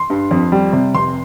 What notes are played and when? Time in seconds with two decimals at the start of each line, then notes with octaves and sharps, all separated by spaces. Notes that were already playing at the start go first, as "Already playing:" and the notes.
Already playing: C6
0.10 G2
0.31 F2
0.52 G3
0.73 C3
0.94 F1 C6